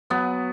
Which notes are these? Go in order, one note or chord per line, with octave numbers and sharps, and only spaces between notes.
F#3 B3